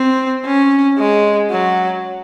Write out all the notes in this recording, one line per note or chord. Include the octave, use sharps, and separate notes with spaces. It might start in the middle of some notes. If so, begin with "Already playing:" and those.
Already playing: C4
C#4
G#3
F#3